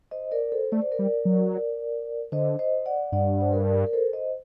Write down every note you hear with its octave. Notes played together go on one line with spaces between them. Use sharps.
C5 D#5
A#4 D5
A4 C5
A3 D5
C5
A#4 D5
G3
F#3
D3 C5 D#5
C5 D#5
D5 F#5
G2 D5 F#5
C5
A#4 D5
A#4
A4 C5
C5 D#5